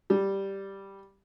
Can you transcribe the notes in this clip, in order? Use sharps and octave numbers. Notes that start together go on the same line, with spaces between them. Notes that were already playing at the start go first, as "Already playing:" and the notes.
G3